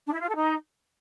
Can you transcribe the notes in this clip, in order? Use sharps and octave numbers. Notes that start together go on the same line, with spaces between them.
D4
E4
F4
A4
D#4